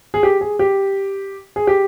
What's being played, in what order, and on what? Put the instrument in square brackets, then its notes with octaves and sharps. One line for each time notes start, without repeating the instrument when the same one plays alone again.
[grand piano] G#4
G4
G#4
G4
G#4
G4